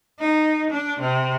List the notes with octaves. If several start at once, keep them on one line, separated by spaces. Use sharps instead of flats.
D#4
D4
C3